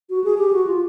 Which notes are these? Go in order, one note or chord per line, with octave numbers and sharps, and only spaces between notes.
F#4
G#4
G4
F#4
F4